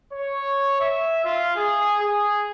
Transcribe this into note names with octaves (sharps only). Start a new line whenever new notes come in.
C#5
E5
F4
G#4
G#4